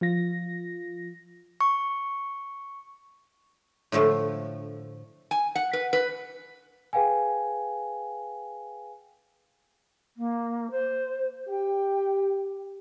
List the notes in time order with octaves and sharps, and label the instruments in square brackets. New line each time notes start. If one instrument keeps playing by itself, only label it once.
[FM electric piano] F3 F4 A#6
[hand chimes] C#6
[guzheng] A2 D3 F3 A3
[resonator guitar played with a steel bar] G#5
F#5
B4
B4
[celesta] G#4 B4 F5 G5 G#5
[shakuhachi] A#3
C5
[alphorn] G4 [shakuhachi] G5